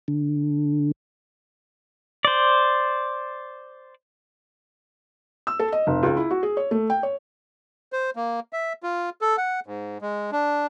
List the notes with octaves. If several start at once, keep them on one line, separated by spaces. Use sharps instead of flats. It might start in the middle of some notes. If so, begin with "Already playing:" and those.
D3
C5 D5
E6
A4
D#5
F1
C#2
E4
F#4
G#4
C#5
A3
G5
C#5
C5
A#3
E5
F4
A4
F#5
G#2
G#3
D4